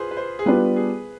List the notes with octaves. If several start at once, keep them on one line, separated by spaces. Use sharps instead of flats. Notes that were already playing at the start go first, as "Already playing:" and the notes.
Already playing: F4 G#4 B4 C5
B4
C5
G#4
G3 B3 D4 F4 B4
G#4